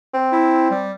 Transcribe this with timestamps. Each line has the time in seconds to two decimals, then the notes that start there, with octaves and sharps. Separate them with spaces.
0.14 C4
0.32 E4
0.71 G3